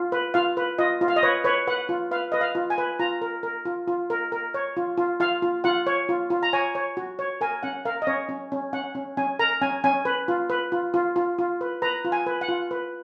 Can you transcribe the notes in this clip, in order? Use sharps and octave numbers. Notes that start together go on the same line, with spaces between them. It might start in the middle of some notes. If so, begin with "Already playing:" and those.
Already playing: F4
B4
F4 F5
B4
F4 D#5
F4
F5
D#5
B4 C#5
B4 C#5
B4 F#5
F4
B4 F5
B4 D#5
F5
F4
G#5
B4
F4 A#5
A#4
A#4
F4
F4
A#4
A#4
C#5
F4
F4
F4 F5
F4
F4 F#5
C#5
F4
F4
A#5
C#5 G#5
C#5
F#4
C#5
A#4 G#5
C#4 F#5
A#4 F5
D#5
C#4 C#5
C#4
C#4
C#4 F#5
C#4
C#4 G#5
A#4 A#5
C#4 G#5
C#4 G#5
B4
F4
B4
F4
F4
F4
F4
B4
B4 A#5
F4
G#5
B4
F#5
F4
B4